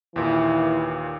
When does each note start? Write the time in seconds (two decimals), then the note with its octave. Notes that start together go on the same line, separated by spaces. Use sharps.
0.16 D#2 A#2 E3